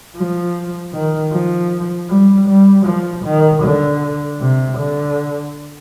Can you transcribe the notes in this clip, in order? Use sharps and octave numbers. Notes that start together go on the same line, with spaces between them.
F3
D#3
F3
G3
G3
F3
D#3
D3
C3
D3